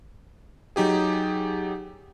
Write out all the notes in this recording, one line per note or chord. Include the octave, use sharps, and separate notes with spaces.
F#3 D#4 G4 G#4